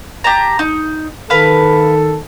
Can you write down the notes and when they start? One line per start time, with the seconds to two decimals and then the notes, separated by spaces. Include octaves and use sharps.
0.24 G4 A5 A#5
0.59 D#4
1.30 D#3 A4 B4 F5